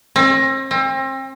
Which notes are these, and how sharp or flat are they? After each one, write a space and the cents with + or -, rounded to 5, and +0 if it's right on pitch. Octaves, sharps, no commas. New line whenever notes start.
C4 +40
C4 +35